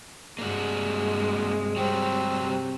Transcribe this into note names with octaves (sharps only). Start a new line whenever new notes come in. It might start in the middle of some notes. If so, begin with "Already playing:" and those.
G2 C3 G#3 A#3 D4 F#4
F#3 G3 C4
C3